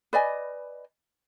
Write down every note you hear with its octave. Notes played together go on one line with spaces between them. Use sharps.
B4 D5 D#5 G#5